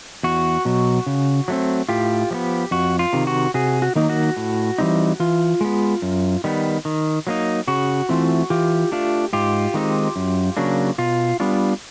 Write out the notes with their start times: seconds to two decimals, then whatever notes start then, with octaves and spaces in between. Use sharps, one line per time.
0.23 E2 F#4
0.65 B2 F#3
1.06 C#3
1.48 F#3 A3 C4
1.89 A2 F4 G4
2.31 F3 G#3 B3
2.71 F2 F#4
2.99 F4
3.13 C3 D#3
3.27 F#4
3.54 C3 F#4 G#4
3.82 F#4
3.95 D#3 F#3 A#3 D#4
4.10 F#4
4.37 A2
4.78 E3 G3 C4 D#4
5.20 E3 F4
5.61 G#3 B3
6.02 F#2
6.44 D#3 G3 B3
6.85 D#3
7.27 F#3 A#3 D#4
7.68 C#3 F#4
8.09 E3 A3 C4 F4
8.50 E3 F4 G4
8.92 A3 D4 F4
9.33 G#2 F4 G4
9.74 D#3 G#3 C4 D#4
10.16 F#2
10.57 C#3 F#3 A#3 D4
10.98 B2 F4
11.40 G3 B3 D4 F4